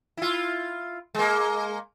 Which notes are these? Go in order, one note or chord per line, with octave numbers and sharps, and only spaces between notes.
E4 F4
G#3 A#3